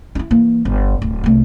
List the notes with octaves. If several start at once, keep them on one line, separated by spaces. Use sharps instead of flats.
D#4 E4
E3 A#3
G1
D1
C2 A3